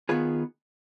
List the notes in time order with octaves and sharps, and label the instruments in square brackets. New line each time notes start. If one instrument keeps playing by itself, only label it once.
[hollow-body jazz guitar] D#3 B3 F4 G#4 B4